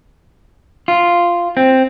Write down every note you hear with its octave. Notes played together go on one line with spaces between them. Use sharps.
F4
C4